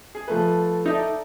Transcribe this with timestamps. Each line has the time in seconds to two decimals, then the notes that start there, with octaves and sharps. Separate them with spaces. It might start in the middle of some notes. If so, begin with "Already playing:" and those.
0.15 G#4
0.28 F3 A3 B4
0.86 D#4 A4 D5 E5